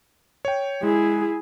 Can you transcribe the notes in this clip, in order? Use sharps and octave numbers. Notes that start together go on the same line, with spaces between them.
C#5 G5
G#3 E4 G#4